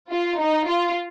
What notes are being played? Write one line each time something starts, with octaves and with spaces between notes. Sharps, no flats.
F4
D#4
F4